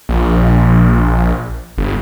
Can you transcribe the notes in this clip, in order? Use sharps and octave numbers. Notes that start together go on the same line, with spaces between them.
A#1
G1